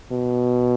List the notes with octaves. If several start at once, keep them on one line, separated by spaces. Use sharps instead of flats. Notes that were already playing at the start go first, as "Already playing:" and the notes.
B2